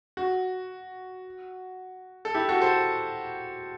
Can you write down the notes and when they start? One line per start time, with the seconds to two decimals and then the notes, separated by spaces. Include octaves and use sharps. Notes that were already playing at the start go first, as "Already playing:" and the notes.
0.17 F#4
2.25 A4
2.34 E4 G4
2.49 F#4 A4
2.61 A4 C5